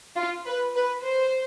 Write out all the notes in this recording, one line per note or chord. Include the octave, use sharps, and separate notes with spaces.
F4
B4
B4
C5